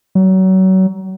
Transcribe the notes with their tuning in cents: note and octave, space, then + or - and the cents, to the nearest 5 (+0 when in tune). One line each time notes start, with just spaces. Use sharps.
F#3 +30